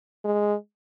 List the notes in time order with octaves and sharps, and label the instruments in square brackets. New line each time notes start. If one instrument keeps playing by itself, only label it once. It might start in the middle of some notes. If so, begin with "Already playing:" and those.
[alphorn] G#3